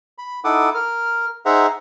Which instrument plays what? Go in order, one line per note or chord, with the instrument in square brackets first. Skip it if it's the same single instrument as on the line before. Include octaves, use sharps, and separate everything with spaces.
[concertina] B5
D#4 E4 A4 F#5 D6 D#6
A#4 F6
D#4 G#4 C5 E5 F#5 A#5